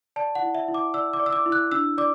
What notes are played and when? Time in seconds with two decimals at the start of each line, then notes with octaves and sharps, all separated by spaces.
0.16 D5 A5
0.35 F#5
0.42 E4
0.55 E5
0.68 E4
0.74 D6
0.94 D5 E6
1.13 D6
1.20 D5
1.26 E6
1.33 D6
1.46 E4
1.52 F#6
1.72 D4 E6
1.98 D5 D6